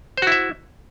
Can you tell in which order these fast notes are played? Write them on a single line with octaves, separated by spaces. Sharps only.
C5 F#4 E4 E5